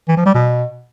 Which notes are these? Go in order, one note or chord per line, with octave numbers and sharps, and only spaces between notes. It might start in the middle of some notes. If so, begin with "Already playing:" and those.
E3
F3
G3
B2